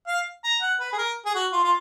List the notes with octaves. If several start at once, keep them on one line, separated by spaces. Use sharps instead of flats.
F5
A#5
F#5
B4
G#4
A#4
G#4
F#4
F4
F4